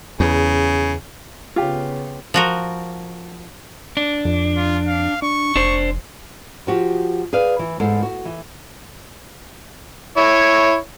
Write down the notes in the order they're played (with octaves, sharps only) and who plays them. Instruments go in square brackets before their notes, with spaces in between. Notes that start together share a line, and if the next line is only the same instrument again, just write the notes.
[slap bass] E2 [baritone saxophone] C#3
[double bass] C#3 B3 [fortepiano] F4 G4
[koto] F3 F#4 A#4
[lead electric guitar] D4
[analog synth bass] F2
[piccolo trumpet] F4
F5
[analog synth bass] D4 [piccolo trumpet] C#6
[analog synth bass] F1 [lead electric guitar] D4 C5
[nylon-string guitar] F3 F#4 G4
G#4 B4 D5 F5
E3
E2 G#2 A4
F#4
E3
[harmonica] E4 C#5